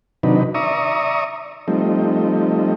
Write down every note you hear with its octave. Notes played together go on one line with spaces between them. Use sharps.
C3 D#3 F#3 D4 D#4 B4
D5 E5 A#5 C#6 D#6
F3 G3 A3 C4 D#4